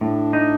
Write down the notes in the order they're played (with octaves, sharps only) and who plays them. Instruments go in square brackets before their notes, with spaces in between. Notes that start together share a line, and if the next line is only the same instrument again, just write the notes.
[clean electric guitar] A2 [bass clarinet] D4
[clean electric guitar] D#4